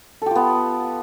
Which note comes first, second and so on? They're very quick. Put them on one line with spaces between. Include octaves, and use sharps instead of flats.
A4 G4 F4 B3